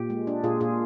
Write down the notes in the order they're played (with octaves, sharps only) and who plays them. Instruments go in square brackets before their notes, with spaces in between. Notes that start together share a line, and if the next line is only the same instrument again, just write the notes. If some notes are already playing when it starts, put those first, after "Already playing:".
Already playing: [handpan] A#2 G4
G#3
D4
A#2 F4 G#4
A#2 F4 G#4